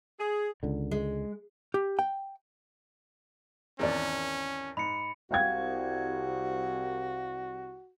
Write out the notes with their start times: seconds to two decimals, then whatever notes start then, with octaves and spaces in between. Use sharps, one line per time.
0.19 G#4
0.63 C#2 D3
0.91 G#3
1.74 G4
1.99 G5
3.79 G#1 E2 C#4 A#4 D5
4.77 G#2 B5 C#7
5.31 C2 F#4 F5 G5 G#6